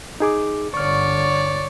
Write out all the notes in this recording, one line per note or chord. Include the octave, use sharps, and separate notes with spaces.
D#4 G#4 D6
G1 D3 C#5 D5 C#6 F6